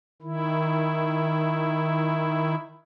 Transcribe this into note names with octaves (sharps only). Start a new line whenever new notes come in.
D#3 E4